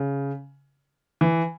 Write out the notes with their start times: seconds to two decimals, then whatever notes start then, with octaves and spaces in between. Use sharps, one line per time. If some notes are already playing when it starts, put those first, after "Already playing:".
Already playing: C#3
1.21 E3